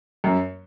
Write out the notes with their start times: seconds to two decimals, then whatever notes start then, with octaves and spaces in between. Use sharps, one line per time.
0.24 F#2